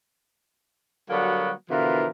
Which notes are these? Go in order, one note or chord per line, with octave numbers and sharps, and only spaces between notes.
D3 F#3 G3 A#3 B3 F#4
B2 D3 E3 F3 F4 A#4